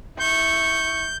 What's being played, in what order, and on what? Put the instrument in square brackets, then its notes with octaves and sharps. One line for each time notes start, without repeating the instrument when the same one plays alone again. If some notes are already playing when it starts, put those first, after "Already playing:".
[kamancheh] E4 C#6 [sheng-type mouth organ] G6